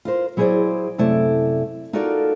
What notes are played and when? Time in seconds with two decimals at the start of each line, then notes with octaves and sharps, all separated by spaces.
0.05 F4 A#4 C5
0.37 F#3 E4 G#4 A#4 C5 D5
0.98 F#2 C3 A3 E4 D5
1.93 D#4 F4 F#4 A4 A#4 D5